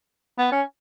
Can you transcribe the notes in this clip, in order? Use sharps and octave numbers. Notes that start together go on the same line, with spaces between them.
B3
C#4